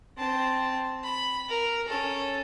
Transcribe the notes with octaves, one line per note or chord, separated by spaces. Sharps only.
C4 A5
B5
A#4
C#4 A4